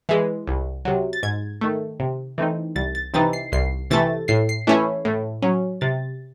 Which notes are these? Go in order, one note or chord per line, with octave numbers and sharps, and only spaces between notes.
E3 G#3
C2
C3 F#3
A6
G#2 G#6
D#3 A3
C3
E3 A3 C4 D#4
C2 A6
A6
C3 E3 C4 D#4 A6
C7
C2 C7
C3 E3 A3 A6
A2 C7
C7
E3 A3 C#4 E4
A2
F#3 C#4
C3 A6